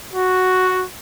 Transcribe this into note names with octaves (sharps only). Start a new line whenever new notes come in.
F#4